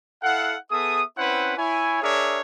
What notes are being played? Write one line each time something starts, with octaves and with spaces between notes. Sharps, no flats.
E4 A4 F5 F#5
B3 G#4 A4 E5 D#6
C4 C#4 E4 B4 C5 F#5
E4 C#5 G#5
D4 G#4 A#4 C#5 D5 E5